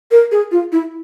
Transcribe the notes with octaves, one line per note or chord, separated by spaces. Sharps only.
A#4
G#4
F4
E4